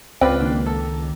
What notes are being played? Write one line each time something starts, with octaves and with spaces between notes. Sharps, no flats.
C#2 C4 F4 B4 D5 G5
D#3 A#3 D4
A4